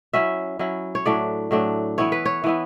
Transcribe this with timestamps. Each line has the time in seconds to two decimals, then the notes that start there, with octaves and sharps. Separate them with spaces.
0.13 F#3 C#4 E4 E5
0.59 F#3 C#4 E4
0.95 C#5
1.06 A2 F#3 A3 D4 D5
1.51 A2 F#3 A3 D4
1.98 E3 B3 E4 C#5
2.12 B4
2.25 C#5
2.44 E3 B3 E4